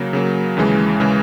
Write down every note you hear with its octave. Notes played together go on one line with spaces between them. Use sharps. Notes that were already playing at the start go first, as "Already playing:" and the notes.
Already playing: C#3 F#3 A#3
C#3 F#3 A#3
D#2 C#3 E3 G#3
C#3 E3 G#3